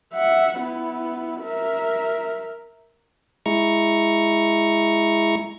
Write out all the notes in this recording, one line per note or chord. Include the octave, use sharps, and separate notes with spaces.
E5 F#5
B3 E4
A#4 E5
G#3 E4 A#5 C#6